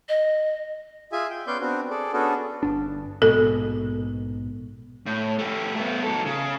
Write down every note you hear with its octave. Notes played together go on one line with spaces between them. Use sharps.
D#5
F4 G#4 E5 G#5
G5
B3 C#4 D5 C6 G6
B3 C4 D4 F#4
G#4 A4 D5
B3 C#4 D4 F#4 G#4 A4
G1 D4
A#1 G#2 B2 A4
A2
A3 G4
A3 B3
F#3 A4
C#3